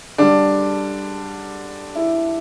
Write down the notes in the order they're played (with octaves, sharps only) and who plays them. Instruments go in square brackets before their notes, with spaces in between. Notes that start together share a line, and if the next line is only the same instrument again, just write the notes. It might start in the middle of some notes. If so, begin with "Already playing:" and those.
[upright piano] D3 G3 D4
E4